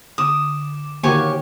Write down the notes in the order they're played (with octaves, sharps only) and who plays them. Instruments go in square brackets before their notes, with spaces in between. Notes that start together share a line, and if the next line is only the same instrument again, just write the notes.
[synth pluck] D3 D6 E7 [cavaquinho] D#6
[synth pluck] D3 D#3 [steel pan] A#3 F#4 [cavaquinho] G4 C#5 G#5